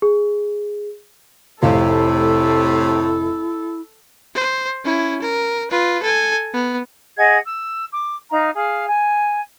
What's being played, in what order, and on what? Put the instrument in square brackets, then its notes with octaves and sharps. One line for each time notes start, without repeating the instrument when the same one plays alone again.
[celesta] G#4
[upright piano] F1 F5 [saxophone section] A2 C3 [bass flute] E4 [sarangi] A4
[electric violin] C5
C#4 E4
A#4
F4 B4
A4 G#5
B3
[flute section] G#4 D#5 F#5 G#6
E6
D6
D#4 F5 A#5
G#4 F5
G#5